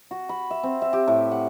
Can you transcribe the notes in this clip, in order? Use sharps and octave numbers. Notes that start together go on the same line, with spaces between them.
F#4
B5
E5
C4
E5
G4
A2
F#5